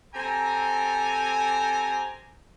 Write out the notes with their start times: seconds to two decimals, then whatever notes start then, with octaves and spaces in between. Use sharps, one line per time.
0.15 C4 G4 A4 G#5 A#5